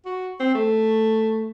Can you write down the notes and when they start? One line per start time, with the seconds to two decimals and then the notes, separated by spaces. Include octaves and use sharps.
0.06 F#4
0.40 C4
0.54 A3